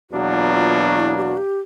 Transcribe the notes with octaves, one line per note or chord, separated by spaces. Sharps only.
E2 B2 F#3 A#3 D4 F#4
F4
F4
F4
E4
G4
F#4
G4